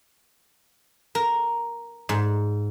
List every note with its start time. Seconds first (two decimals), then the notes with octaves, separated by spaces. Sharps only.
1.15 A#4
2.09 G#2